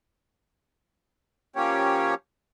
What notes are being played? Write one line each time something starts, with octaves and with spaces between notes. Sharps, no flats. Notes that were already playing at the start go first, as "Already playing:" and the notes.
F3 A#3 C#4 G4 C#5